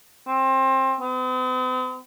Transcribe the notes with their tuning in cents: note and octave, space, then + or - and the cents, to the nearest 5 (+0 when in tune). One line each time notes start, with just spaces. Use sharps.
C4 +25
C4 -45